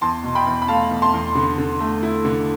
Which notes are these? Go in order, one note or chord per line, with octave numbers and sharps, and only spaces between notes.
E2 A5 C6
B2
G5 B5
E2
B5
A3 F5 A5
E2
A5 C6
E2
D3
D3
A3
E4
D3